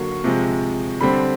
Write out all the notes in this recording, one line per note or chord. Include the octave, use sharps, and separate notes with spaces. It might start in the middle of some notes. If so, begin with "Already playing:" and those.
Already playing: D3 F#3 A#3 C#6
C3 F3 G#3
D3 G3 C4 B5